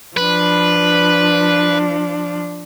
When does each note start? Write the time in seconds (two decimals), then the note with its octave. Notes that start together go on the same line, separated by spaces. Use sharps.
0.17 F3 D4 B4